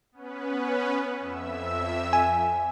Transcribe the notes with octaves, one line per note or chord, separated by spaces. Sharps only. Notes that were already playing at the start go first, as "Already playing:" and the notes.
B3 C#4 B4
F2 E5 E6
G#5